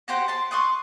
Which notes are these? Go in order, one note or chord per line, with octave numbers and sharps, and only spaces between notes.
F#4 G4 C5 F#5
A5 C6
C6 C#6 D#6 F#6